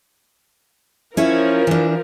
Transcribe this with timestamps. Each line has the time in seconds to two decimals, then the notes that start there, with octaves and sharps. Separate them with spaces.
1.17 F3 C#4 E4 A#4 C#5
1.67 E3 D4